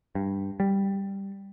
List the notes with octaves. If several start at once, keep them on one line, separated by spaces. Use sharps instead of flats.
G2
G3